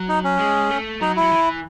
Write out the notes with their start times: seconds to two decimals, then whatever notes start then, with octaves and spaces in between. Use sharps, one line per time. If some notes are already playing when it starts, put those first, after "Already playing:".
Already playing: F#3
0.09 D#4
0.24 C#4
0.39 G#3
0.70 A3
1.01 F#3 D#4
1.16 E4
1.22 F#3
1.32 E3